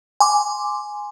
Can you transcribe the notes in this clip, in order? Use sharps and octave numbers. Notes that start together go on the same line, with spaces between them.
G#5 C6 D6